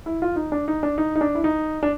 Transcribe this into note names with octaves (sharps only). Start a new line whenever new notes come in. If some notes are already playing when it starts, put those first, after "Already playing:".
E4
F4
D#4
D4
D#4
D4
D#4
D#4
D4
E4
D#4
D4